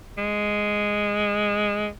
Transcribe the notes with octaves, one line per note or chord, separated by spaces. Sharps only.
G#3